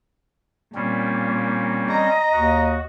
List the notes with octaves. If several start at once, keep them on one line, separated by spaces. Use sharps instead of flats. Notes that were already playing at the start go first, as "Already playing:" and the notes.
A#2 G3 C4 C#4
D#5 A#5
D#2 F#4